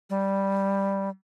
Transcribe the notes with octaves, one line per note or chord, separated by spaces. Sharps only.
G3